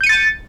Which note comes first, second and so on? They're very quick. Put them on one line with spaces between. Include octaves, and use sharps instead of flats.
G6 D#7 C#7 A6